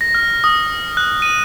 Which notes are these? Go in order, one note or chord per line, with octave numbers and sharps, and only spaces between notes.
A#6
F6
F6
D#6
F#6
D#7